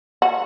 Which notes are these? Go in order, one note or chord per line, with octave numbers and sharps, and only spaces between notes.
F#4